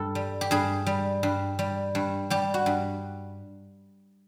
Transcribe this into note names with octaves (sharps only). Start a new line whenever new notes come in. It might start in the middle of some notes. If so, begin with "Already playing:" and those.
Already playing: G2 A4
G3
G4
G2 G#4
G3
G2
G3
G2
G3 G4
F#4
G2